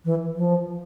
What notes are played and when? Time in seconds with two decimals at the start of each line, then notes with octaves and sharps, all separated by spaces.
0.05 E3
0.36 F3